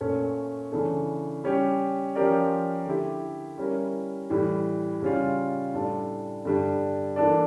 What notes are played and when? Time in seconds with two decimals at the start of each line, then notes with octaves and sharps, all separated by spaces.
0.01 A#2 A3 C#4
0.72 C#3 E3 A3 D4
1.44 G3 C#4 G4
2.15 F3 C#4 G4 A#4 D5
2.86 D3 A3 E4 G4
3.58 G3 C#4 E4 A#4
4.30 A2 E3 G3
5.02 C#3 G3 C#4 F4
5.74 A2 G3 D4 A4 D5
6.45 G2 D3 G3 D4
7.16 E3 A#3 D4 A4 D5